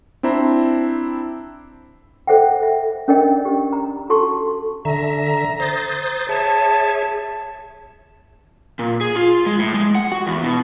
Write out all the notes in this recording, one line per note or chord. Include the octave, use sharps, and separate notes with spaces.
C4 D4 E4 C5 A#5
A4 C5 E5 F#5 G5
E5
C#4 D4 A#4 D5 D#5 G5
G4
A#5
F#4 A4 A5 C6 C#6
D3 E5 A#5
C5 D#6 A6
G#4 C#5 E5 A5
A#2
G#4
F4
G#3
A2
G#3
F#5
F#4
E2
B2